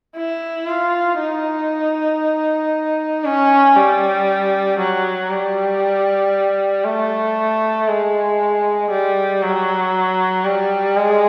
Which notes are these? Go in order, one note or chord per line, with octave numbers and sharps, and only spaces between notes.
E4
F4
D#4
C#4
G3
F#3
G3
A3
G#3
G3
F#3
G3
G#3